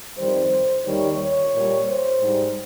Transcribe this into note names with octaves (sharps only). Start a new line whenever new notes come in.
F2 D#3 G3 C5
D#2 D#3 G3 C#5
C#5
A#2 G3
C5
G#2 G3